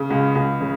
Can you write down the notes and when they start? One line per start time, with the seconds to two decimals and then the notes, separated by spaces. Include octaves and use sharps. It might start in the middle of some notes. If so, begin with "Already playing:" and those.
Already playing: C#3
0.10 C#2
0.35 C#2
0.61 C#3